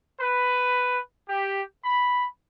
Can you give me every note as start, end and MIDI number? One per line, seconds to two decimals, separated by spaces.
0.19 0.98 71
1.28 1.62 67
1.83 2.24 83